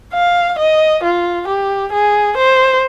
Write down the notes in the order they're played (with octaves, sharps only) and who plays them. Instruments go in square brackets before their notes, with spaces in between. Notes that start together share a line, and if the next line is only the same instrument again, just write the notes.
[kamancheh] F5
D#5
F4
G4
G#4
C5